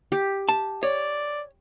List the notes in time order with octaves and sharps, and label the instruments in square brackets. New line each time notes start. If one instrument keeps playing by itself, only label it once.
[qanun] G4
[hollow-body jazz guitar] A5
[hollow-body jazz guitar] C#5 [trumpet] D5